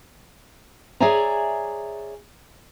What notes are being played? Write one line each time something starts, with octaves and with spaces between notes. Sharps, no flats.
G#4 C#5 D5 E5 G#5 A#5